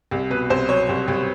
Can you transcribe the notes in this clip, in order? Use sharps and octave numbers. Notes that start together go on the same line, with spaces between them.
C2
B2 B4
C2 C5
F#3 C#5
C2
C2